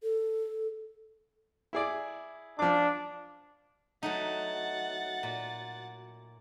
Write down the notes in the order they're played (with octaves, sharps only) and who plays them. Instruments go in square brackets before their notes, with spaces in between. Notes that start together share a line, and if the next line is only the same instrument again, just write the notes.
[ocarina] A4
[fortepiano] E4 G#4 D5
[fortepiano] F3 D6 [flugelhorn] D4
[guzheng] F#3 A3 D#4 [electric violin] F#5 A6
[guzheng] A#2